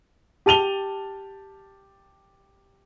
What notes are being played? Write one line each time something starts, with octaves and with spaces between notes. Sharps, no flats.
G4 A5 D#7 F7 G7